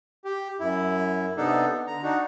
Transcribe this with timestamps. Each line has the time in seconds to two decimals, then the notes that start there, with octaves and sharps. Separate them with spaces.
0.25 G4
0.60 F#2 E4
1.37 C3 B3 D4 D#4 A4
1.71 B3
1.87 D3 A#5
2.03 D4 D#4 F#4